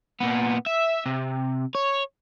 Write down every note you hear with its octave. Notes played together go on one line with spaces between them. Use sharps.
A#2 B3
E5
C3
C#5